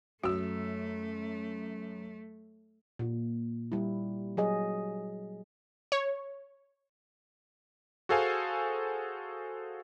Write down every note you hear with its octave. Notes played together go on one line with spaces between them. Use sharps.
F#2 A3 F#4 E6
A#2
G3 E4
F#3 G#4 D#5
C#5
F#4 G#4 A4 C5 F5 G#5